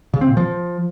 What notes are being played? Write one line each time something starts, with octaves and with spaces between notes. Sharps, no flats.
C#3
C4
A#2
F3